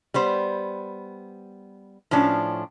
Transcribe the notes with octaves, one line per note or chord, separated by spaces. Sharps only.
G3 B3 C5
A2 F3 C#4 D4